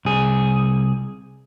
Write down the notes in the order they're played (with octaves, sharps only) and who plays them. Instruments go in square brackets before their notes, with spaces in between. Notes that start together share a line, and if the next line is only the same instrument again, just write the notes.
[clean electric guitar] C2 G#4